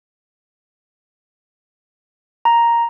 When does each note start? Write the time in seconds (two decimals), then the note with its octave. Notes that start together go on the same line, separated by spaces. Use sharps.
2.45 A#5